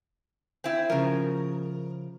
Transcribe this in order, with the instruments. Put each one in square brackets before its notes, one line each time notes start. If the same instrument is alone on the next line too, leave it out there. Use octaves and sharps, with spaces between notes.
[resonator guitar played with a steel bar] C4 E4
[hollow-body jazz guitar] C#3 F3 [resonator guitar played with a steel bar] A#4